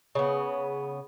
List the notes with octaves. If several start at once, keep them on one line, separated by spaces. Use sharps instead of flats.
C#3 B3